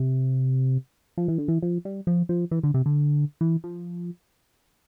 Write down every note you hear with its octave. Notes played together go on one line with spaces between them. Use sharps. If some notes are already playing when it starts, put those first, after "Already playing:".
Already playing: C3
F3
E3
D3
E3
F3
G3
F3
F3
E3
D3
C3
D3
E3
F3